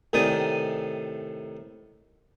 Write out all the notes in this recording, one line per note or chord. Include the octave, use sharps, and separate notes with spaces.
A2 C3 D#3 D5 G#5 D#6